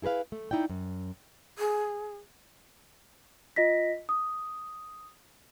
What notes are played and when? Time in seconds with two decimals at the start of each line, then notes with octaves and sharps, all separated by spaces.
0.02 E4 G#4 A#4 B4 F5
0.32 A3
0.51 D#4 E4 D5 G5
0.70 F#2
1.58 G#4
3.56 F4 D#5 A#6 B6
4.09 D#6